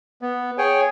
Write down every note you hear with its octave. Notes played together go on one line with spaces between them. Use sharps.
B3
G#4 C#5 G5 G#5